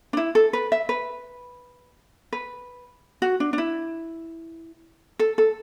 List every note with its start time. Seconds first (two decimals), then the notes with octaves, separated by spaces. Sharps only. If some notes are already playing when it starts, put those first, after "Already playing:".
0.13 D4
0.17 E4
0.35 A4
0.53 B4
0.72 E5
0.89 B4
2.33 B4
3.22 F#4
3.40 D4
3.53 D4
3.58 E4
5.19 A4
5.38 A4